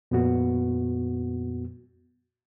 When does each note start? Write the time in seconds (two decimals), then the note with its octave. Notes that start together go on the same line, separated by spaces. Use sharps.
0.11 F2 A#2 B3 F#4